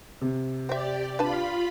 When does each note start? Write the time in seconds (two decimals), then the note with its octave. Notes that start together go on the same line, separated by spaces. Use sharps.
0.21 C3
0.69 C4 G4 D5 E5
1.19 D4 F4 B4 A5 B5